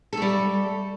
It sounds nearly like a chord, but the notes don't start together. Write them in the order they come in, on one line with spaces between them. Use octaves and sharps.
A4 A3 G3